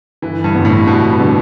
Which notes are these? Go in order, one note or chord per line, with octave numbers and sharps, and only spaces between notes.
G1 E3
G2
F2 D3 G3 B3
A2
G1 B2
D3 G3 B3